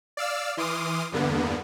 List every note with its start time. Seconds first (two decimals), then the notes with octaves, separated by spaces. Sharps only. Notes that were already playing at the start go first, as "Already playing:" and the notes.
0.17 D5 F5 E6 F6
0.57 E3 C6 D6 D#6 F6
1.12 E2 G2 D3 A#3 B3